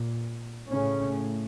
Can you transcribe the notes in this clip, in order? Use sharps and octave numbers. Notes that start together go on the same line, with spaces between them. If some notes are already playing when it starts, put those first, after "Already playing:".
Already playing: A#2
A2 C#3 C#4